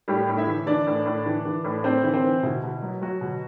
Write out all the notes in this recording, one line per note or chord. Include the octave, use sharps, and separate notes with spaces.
A2 G3 G4
A2
E4 E5
E3
E3 D4 D5
A2
A2
E3
E3
A2
A2 C4 C5
E3
C4 C5
E3
B2 E4
B2
F#3
F#3 F#4
B2